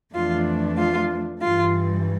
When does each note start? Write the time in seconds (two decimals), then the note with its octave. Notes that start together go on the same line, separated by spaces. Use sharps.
0.14 F2 E3 A3 D4 F4
0.78 F4
1.42 G2 E3 G3 F4